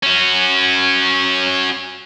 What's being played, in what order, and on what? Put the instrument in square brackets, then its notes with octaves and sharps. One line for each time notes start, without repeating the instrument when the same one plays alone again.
[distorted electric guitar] C#4 F#4